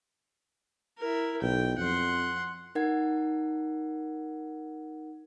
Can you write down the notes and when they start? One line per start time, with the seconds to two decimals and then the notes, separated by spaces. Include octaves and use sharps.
0.98 E4 A#4
1.42 B1 G5
1.78 F2 F#5 C6
2.75 D#4 A#4 F#5 G#6